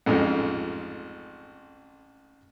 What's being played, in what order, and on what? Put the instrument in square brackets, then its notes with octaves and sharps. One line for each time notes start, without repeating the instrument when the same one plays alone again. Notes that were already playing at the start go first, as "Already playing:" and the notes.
[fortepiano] A1 F2 G#2 F3